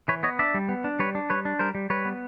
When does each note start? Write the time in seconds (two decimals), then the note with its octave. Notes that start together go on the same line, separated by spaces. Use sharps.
0.08 E3 B4 C#5
0.23 B3 C#5 D#5
0.39 D4 D5 E5
0.54 G3
0.69 B3
0.84 D4
0.99 G3 B4 C#5
1.15 D4
1.30 G3 B4 C#5
1.45 D4
1.59 G3 A#4 C5
1.75 G3
1.90 G3 B4 C#5
2.05 B3